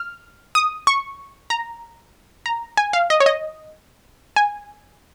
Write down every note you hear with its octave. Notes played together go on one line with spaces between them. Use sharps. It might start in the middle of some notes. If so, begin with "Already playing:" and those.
Already playing: F6
D#6
C#6
A#5
A#5
G#5
F5
D#5
C#5
D#5
G#5